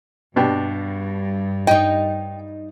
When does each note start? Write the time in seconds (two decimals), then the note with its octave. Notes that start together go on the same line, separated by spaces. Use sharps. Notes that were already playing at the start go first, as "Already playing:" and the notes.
0.36 G2 B2 D4 G4
1.67 D#4 D#5 G5